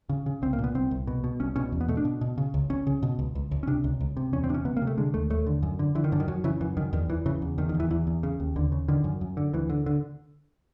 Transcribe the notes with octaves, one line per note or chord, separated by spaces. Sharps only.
C#3
C#3
C2 C4
A#3
A#2
B3
C2 C4
C2
B2
B2
C2 C#4
B2 C#4
E2
B3
B2 A3
D4
B2
B2
C#3
C#2
C#2 C#4
C#3
B2
C#2
C#2
C#2
C#4
C3 D4
C#2
C#2
C3
E2 C#4
C4
C3 D4
C#4
C3 B3
A#3
C3
A3
D3 G#3
D#2 A3
D#2 A3
D3
F#2
D3
D3 E3
D#3
F#2 D3
D#3
F#2 F#3
C#3 E3
F#2 E3
F#2 D#3
E2 D#3
E2 E3
C#3 E3
E2
E2 D#3
D#3
E2
E3
E2 E3
E2
C#3
D#2
D#2 D3
C#3
D3 D#3
F#2
F#2
D3
D2 E3
D3
D3